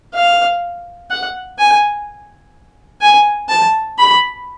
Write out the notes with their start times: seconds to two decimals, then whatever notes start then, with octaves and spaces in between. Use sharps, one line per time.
0.14 F5
1.11 F#5
1.59 G#5
3.01 G#5
3.49 A5
3.98 B5